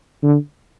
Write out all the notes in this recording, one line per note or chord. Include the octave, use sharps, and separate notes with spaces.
D3